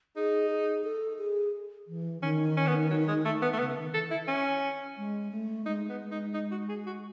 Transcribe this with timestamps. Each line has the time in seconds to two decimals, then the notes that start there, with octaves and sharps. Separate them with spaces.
0.16 D#4 G#4
0.50 G#4
0.84 A4
1.19 G#4
1.87 E3
2.22 D#3 C#4
2.57 C#4
2.67 B3
2.90 F#3
3.08 G#3
3.25 A3
3.42 B3
3.53 A3
3.59 C#3 B3
3.77 D#3
3.94 E3 A4
4.11 E4
4.27 C#4
4.97 G#3
5.31 A3
5.65 G#3 D#4
5.89 B3
6.11 D#4
6.34 D#4
6.51 F#4
6.69 G#4
6.86 F#4